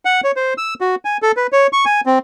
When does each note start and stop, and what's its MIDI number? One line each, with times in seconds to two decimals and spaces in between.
0.05 0.21 78
0.24 0.32 73
0.36 0.54 72
0.58 0.74 88
0.81 0.95 66
1.05 1.17 80
1.22 1.32 69
1.37 1.47 71
1.52 1.67 73
1.73 1.85 85
1.85 2.01 80
2.06 2.19 60